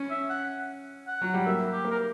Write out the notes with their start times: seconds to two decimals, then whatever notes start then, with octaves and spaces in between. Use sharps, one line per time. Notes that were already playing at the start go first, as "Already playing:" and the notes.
Already playing: C#4
0.10 E5
0.30 F#5
1.08 F#5
1.22 F#3
1.34 G3
1.46 A#3 E5
1.72 G4
1.85 A#3
1.91 A#4